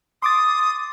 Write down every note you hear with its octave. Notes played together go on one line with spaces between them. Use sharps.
C6 D6 D#6 A6